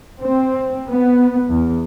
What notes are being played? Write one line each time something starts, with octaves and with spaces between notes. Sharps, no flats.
C4
B3
E2